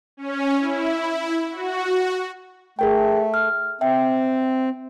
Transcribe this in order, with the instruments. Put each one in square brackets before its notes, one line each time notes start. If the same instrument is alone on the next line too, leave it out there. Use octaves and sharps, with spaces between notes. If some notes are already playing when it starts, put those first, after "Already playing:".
[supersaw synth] C#4
E4
F#4
[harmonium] A3 [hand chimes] G#4 A#4 G5
[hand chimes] F6
[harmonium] C4 [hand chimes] E5 G5